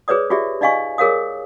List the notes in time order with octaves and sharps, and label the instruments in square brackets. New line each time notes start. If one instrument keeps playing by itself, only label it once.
[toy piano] G#4 B4 C#5 D5 D#6
F4 G4 G#4 D5 E5
D#4 D5 D#5 F5 G#5 C#6
G#4 A#4 C#5 F5 D#6